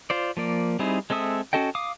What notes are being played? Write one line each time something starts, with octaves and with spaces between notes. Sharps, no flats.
F4 C5 D5
F3 A#3 D5
G3 C4 D#4 E4 G#4
G#3 C4 A4 E5 D#6
C#4 F#4 A4 D#5 G5
F5 D6 D#6